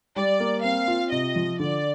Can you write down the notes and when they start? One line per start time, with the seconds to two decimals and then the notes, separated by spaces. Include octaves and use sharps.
0.16 G3 D5
0.40 A#3
0.64 C4 F5
0.88 F4
1.12 C3 D#5
1.36 F3
1.59 D3 D5